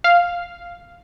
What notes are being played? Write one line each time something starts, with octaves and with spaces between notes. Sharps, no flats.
F5